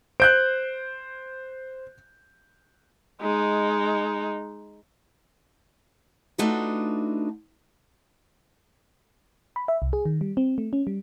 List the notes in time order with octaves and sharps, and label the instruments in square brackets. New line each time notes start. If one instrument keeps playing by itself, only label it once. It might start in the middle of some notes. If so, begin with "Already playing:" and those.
[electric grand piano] C5 [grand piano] F#6 G6 D7
[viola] G#3 D#4
[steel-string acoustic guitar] A3 D4 D#4 F4 F#4 B4
[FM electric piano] B5
E5
C2
G#4
D#3
G3
C4
A3
C#4
G3